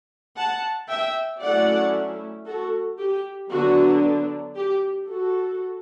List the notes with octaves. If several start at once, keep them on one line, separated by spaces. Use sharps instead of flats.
F#5 A5
E5 G5
F#3 A3 C#4 E4 D5 F#5
F#4 A4
G4
D3 F#3 B3 D4 F#4
G4
F#4 A4